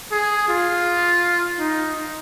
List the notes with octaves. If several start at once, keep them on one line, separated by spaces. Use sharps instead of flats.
G#4
F4
D#4